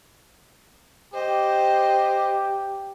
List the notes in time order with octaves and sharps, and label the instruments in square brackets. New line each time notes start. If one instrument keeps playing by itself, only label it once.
[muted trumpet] G4 [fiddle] C5 D#5